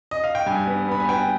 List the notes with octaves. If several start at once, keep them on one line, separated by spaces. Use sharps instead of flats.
D#5
F5
G5
G2 G#5
B3
B3 B5
G#5
B3 G5